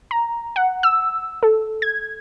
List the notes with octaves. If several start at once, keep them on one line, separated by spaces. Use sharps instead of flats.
A#5
F#5
E6
A4
G#6